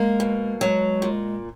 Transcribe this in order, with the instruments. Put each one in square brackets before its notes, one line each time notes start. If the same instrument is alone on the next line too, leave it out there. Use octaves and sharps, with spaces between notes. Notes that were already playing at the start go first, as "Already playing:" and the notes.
Already playing: [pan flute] G#3 [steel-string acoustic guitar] A#3
[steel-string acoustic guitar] B2
[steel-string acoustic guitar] F#3 [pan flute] G#3
[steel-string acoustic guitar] A#2